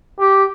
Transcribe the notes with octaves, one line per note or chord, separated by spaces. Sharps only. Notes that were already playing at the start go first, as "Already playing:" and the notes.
G4